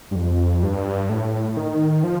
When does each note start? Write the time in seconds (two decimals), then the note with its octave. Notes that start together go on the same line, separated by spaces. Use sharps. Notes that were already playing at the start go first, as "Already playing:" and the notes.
0.11 G2
0.16 F2
0.63 G2
1.09 A2
1.57 D#3
2.04 F3